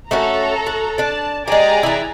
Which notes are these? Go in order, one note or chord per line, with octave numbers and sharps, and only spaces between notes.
A3 C#4 F#4 A4 A#5
F#4
D4 D5 A5
G#3 G4 G#4 D5 A#5
E3 E4